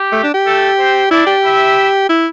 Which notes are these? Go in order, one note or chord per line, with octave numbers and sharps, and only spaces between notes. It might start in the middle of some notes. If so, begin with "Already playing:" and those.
Already playing: G4
A3
D4
G4
A3 A4
C4 C5
D4 E4 D5
G4
E4 E5
E4